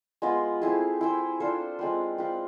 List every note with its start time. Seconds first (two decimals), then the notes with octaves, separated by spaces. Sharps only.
0.22 G#3 B3 F4 B4
0.62 A3 C4 E4 G#4
1.01 E4 G#4 C5
1.40 D4 F4 A4 C5
1.79 G#3 C4 F4 B4
2.18 C4 F4 B4